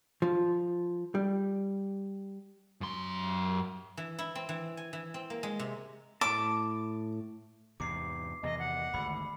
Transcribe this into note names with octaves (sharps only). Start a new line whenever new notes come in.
F3
G3
F#2 C6
E3
E4
C4
E3
G#5
E3
C4
A#3
G#3
C3
A2 A5 D6
E2 G#2 C3 D6 C7
E2 C3 D#3 D#5
F#5
G#1 D2 B5